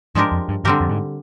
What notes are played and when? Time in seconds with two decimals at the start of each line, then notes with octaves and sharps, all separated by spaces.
0.15 G#2 F3 G#3 D4 G4 A#4
0.32 F2
0.49 G2
0.64 G2 D3 G3 C4 G4 A#4
0.81 F2
0.89 G#2